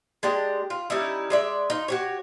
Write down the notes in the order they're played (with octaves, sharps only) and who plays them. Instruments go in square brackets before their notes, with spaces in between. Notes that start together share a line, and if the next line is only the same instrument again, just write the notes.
[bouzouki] G#3 D4 G4 D#5
F4
G3 C#4 D#4 E4
G#3 D5 E5
D#4 F4
F#4 G4 C#5